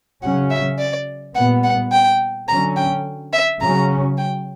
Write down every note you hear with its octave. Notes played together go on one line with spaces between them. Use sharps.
C#3 F#3 C#4 F#5
E5
D5
A#2 G3 B3 F#5
F#5
G5
D3 F#3 C#4 A#5
G5
E5
C#3 F#3 C#4 A#5
G5